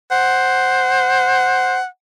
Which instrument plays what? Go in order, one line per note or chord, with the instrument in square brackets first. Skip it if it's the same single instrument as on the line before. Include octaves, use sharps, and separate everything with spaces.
[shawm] C5 [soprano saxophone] F#5